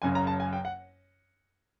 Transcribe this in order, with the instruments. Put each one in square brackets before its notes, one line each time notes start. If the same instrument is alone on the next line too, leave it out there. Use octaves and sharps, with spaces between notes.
[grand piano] F#1 F#2 C#3 G#5
A#5
A5
G#5
G5
F#5